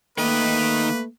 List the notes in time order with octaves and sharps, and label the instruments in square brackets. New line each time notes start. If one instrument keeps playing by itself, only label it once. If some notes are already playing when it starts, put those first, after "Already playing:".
[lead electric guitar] D#3 D#5 [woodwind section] A3 A#3 [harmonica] B4